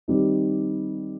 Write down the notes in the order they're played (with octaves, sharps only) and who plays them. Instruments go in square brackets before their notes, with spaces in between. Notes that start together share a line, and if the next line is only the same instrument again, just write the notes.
[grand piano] D#3 G3 C4 D#4